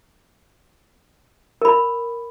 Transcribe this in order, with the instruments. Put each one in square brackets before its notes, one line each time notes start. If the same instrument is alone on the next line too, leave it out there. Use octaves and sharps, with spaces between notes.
[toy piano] A#4 B5